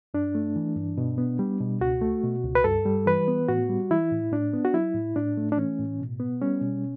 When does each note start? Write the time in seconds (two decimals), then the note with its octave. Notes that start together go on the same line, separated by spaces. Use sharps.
0.14 G2 D4
0.35 A3
0.56 E3
0.76 G2
0.98 B2
1.18 B3
1.39 G3
1.60 B2
1.81 C#2 F#4
2.02 A3
2.23 B2
2.44 C#2
2.55 B4
2.64 G2 A4
2.86 G3
3.06 E3 B4
3.28 B3
3.49 A2 F#4
3.69 G3
3.91 E3 E4
4.12 A2
4.32 A2 D4
4.54 B3
4.65 F#4
4.74 F#3 E4
4.94 A2
5.16 A2 D4
5.37 A3
5.52 D4
5.57 E3 C#4
5.79 A2
6.00 B2
6.20 B3
6.42 G3 C#4
6.62 B2